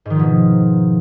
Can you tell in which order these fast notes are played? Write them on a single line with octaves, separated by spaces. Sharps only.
G#2 D#3 F3 B2